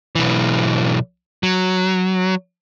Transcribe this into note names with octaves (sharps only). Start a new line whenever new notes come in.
B1 E3
F#3